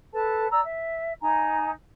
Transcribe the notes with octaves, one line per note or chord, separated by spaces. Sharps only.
A4 B4 A5
D5 A#5 E6
E5
D#4 G#5 A#5